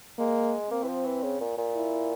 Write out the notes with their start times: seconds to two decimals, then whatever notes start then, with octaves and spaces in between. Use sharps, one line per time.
0.19 G#3 A#3
0.71 A#3 C4
0.83 E3
0.88 F3
1.05 E3
1.23 C#3
1.41 A#2
1.58 A#2
1.75 E4